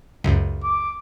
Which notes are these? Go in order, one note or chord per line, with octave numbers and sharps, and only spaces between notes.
C#2 F#2
D6